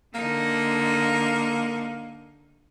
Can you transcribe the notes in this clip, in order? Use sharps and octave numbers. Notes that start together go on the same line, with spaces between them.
D3 A#3 D#4